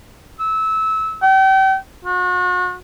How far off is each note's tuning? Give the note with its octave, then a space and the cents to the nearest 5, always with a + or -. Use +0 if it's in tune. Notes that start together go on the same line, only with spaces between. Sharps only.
E6 -20
G5 -35
F#4 -35